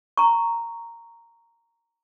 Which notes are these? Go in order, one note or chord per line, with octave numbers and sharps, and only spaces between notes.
A#5 C#6